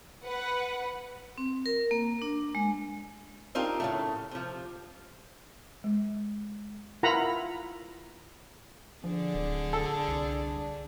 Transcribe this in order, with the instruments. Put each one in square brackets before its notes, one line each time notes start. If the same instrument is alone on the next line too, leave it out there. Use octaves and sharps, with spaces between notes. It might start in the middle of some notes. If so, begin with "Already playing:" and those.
[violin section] B4 F#5
[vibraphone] C4
A#4
A#3
D4
G#3
[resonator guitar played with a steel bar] C4 D4 D#4 F4 G4 A#4
A2 C#3 A3
C3 F3
[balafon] G#3
[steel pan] E4 F4 A#4 F#5 A#5 B5
[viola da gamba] D3 D4 G#4 [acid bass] F3
[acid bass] D1
[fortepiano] A4
[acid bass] C2